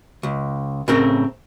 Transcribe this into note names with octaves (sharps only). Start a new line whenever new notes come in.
C#2
A2 C#3 C4 A#4